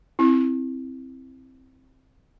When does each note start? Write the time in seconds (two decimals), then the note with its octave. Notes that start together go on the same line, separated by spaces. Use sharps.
0.19 C4 E4